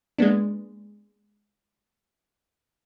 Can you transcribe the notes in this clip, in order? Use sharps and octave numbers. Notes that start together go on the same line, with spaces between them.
G#3 A#3 B3 D4